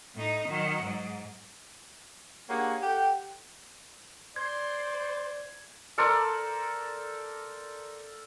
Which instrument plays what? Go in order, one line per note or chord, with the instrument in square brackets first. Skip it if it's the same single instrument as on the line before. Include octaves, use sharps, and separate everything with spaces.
[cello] A2 D#4
D#3 F#3
G#2
[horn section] A#3 D4 G4 G#4 C#5 F#5
G4 A4 F#5 G5
[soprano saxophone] C5 [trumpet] D5 [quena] C6 [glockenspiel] G#6
[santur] A4 A#4 C5 D5